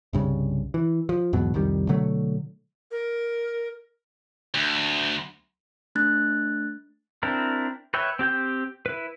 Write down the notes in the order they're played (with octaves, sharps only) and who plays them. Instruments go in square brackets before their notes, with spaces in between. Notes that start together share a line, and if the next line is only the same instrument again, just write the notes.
[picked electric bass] C2 G2 C#3
E3
F3
E2 G#2 B2 F#3
C2 F2 D#3 G3
B2 D3 F#3 A3
[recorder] A#4
[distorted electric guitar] D2
[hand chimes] A3 D4 F#6 A6
[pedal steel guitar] C4 D4 E4 A#4
B4 C#5 E5 G5
C4 G4 G5 G6
E4 B4